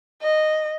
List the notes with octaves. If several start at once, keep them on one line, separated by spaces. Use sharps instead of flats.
D#5